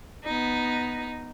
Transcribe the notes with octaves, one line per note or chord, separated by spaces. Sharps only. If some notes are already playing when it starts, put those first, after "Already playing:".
B3 D#4